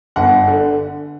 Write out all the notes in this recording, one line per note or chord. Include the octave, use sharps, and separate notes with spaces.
G1 F#5
D3